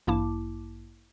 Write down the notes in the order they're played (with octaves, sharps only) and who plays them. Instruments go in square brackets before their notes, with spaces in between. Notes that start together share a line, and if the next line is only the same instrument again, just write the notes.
[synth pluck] A1 G2 A#3 E4 A5 D6